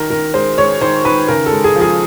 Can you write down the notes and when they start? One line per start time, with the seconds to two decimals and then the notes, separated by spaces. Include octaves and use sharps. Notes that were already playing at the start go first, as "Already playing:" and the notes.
Already playing: D#3 A#4
0.10 D#3 A#4
0.34 G#3 C5
0.58 G#3 C#5
0.81 D#3 C5
1.05 D#3 B4
1.28 C#3 A#4
1.46 A4
1.52 G#3
1.64 G#4
1.76 F3
1.81 G#4